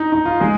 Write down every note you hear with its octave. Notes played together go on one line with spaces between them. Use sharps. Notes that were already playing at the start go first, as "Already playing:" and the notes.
Already playing: D#4
D#4
F4
G#3 G#4